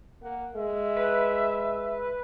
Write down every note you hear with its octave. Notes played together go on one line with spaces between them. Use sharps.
A#3 F#5
G#3 E5
B4